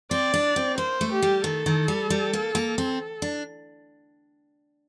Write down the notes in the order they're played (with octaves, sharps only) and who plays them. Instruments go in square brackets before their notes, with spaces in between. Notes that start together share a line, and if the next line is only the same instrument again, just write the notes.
[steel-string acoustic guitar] C4 [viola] D5
[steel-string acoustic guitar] D4
C4
[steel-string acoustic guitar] A#3 [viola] C5
[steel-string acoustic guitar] A3
[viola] G4
[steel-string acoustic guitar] G3
[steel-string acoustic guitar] D#3 [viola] A4
[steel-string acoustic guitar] D#3
G3
G3
A#3
A#3
C4
D4